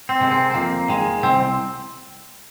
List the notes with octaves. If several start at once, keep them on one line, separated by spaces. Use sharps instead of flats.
C4
C3 D#3 G#3
C4
C4
F2 A#3
D#3 G#3
C2 C4